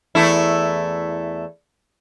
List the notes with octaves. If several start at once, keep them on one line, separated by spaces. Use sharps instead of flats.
E2 A3 E4